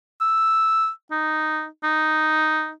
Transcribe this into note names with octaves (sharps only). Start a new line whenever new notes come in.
E6
D#4
D#4